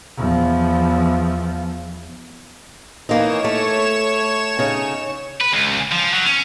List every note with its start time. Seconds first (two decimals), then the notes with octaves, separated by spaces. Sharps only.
0.17 E2 F3
3.09 E3 A#3 D#4 C#5 E7
3.44 A3
4.59 C#3 D#4
5.41 B4
5.53 C#2
5.91 F3
6.13 F#3
6.25 C#4